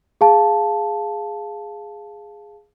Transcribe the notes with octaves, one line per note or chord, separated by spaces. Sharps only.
G#4 F5 A5